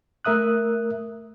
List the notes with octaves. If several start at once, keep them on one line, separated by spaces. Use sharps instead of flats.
A3 A#4 E5 D#6 F#6